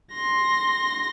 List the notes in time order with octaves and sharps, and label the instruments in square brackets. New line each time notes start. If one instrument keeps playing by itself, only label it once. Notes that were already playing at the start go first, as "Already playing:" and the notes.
[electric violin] C6 A#6